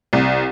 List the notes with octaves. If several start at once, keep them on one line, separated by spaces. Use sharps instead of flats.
C2